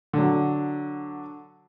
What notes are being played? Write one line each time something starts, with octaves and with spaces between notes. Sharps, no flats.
D3 F#3